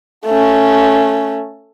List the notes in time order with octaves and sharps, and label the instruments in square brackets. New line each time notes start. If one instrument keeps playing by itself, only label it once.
[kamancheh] A3 C#4